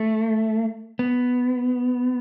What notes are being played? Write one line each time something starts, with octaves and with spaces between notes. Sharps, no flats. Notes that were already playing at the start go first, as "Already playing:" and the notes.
Already playing: A3
B3